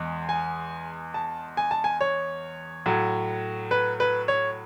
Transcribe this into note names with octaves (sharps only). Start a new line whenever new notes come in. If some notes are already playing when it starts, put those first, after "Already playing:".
Already playing: E2 G#3
G#5
A5
G#5
A5
G#5
C#5
A2 F#3
B4
B4
C#5